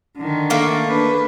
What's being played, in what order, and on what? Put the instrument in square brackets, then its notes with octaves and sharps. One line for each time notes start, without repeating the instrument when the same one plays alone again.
[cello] D3 D#3
[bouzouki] A3 A#3
[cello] D4 B4